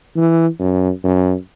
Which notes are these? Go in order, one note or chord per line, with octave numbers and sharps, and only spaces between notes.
E3
F#2
F#2